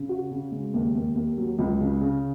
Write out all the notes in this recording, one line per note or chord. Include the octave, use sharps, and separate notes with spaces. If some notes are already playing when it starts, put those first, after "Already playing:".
Already playing: C#3
F#4
C#3
G#3
D#2
D#2
D#2
F#3
C#2
C#3
C#3